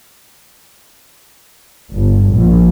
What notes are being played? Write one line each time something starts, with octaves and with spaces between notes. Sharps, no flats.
G1
A#1